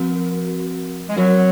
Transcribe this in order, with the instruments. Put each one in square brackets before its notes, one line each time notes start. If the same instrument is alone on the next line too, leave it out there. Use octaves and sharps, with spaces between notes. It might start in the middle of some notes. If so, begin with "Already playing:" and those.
Already playing: [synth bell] F3 C4 F#4 A#4
[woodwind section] G#3
[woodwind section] F#3 [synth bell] C4 F#4 A#4